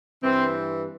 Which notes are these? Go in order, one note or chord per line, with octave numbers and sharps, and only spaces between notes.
G2 E3 C4